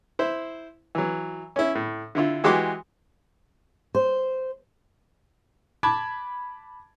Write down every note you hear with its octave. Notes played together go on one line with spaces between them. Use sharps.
E4 C5
E3 F#3
C#4 E4
A2
D3 E4 F4
E3 G#3 F#4 G4 C6 D6
C5
A5 B5 D6 G#6